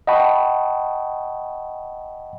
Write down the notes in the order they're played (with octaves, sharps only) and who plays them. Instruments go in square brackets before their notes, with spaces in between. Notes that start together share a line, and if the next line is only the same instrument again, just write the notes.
[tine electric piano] D#5 F#5 G5 A5 B5 C#6